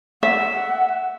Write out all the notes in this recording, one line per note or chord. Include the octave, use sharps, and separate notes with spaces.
E5 F#5